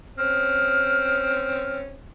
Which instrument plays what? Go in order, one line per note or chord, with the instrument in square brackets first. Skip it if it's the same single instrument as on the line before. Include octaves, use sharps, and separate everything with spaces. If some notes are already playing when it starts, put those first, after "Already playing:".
[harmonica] C4 C#4 [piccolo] F6